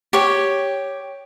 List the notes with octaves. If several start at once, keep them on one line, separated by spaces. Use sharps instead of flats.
G4 C#5